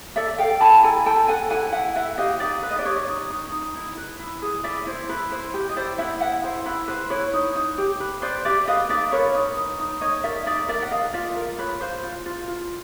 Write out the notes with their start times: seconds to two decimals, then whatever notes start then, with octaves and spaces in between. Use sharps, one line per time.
0.16 A4 D5 E5
0.38 A4 F5 G5
0.61 E4 A5 B5
0.83 A4 G#5 A#5
1.06 A4 G5 A5
1.28 A4 F#5 G#5
1.50 E4 F#5 G#5
1.73 E4 E5 F#5
1.95 B4 E5 F#5
2.18 G4 D#5 F5
2.40 D#4 D5 E5
2.63 B4 E5
2.71 D#5
2.79 D5
2.85 G4 C#5 D#5
3.07 D#4
3.30 D#4
3.52 D#4
3.75 E4
3.97 B4
4.20 E4
4.42 G#4
4.64 E4 D5 E5
4.86 E4 C5
5.09 E4 B4
5.31 E4 C5
5.54 G4
5.69 D#5
5.76 E4 C5 D5
5.98 E4 E5 F#5
6.21 E4 E5 F#5
6.43 E4 C5
6.66 E4 B4
6.88 B4 C5
7.10 E4 B4 C#5
7.33 D#4
7.55 D#4
7.78 G4
8.00 B4
8.22 B4 C5 D5
8.45 G4 D5 E5
8.68 B4 D#5 F5
8.89 D#4 D5 E5
9.12 A#4 B4 C#5
9.35 D#4
9.57 D#4
9.79 D#4
10.01 D#4 C#5 D#5
10.24 A#4 D5 E5
10.46 D#4 D5 E5
10.68 A#4 D5 E5
10.82 F#5
10.91 A#4 D#5 F5
11.13 F4 D5 E5
11.36 A#4
11.58 F4 B4 C#5
11.81 F4 C5
12.03 F4
12.26 F4
12.48 F4